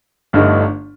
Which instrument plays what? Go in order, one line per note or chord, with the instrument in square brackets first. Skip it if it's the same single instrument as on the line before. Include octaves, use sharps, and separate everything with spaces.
[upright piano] G1 G2 D3 A3 D#4